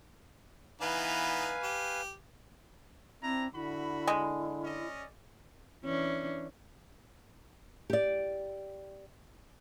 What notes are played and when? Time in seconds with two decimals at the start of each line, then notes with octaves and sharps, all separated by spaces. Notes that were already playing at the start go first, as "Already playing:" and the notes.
0.81 E3 B3 D#4 B4 F5 G#5
1.63 G4
3.22 C4 D4 E4 A#5
3.55 D3 E4 F#4 B5
4.08 G#3
4.63 C#4 D5 D#5
5.84 E3 C#4 D4
7.90 G4 D5